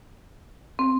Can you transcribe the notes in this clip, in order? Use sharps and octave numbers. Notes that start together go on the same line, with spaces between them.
C4